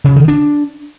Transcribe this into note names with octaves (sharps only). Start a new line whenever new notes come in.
C#3
D#3
D4